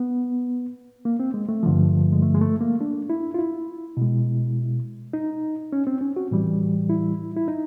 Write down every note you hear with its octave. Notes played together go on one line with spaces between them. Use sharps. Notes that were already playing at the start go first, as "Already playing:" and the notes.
Already playing: B3
A#3
C4
G#3
A3
G2 D3 F3
G#3
A3
G#3
A3
A#3
D4
E4
F4
E4
B2 G#3
D#4
C#4
C4
C#4
F#4
A2 E3 G3
E4
E4
D#4